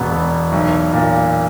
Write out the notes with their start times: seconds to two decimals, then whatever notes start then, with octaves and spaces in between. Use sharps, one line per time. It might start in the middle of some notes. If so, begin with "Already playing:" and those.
Already playing: E1 B2 B3
0.11 E1
0.52 B1
0.93 A#2